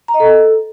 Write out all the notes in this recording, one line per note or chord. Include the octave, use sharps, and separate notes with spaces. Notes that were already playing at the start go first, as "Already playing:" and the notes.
A#5
D#5
A4